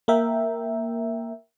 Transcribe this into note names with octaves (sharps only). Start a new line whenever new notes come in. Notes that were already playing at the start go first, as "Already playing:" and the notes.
A#3 A#4 E5 G5